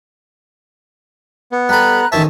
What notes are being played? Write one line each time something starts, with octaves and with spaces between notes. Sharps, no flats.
B3
G3 A4 A#5 B5 F#6
A1 D#3 C#5 E5 A5